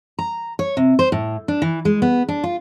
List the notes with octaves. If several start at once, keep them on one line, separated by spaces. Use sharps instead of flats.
A#5
C#5
C3
C5
A2
D4
E3
G#3
B3
D4
F4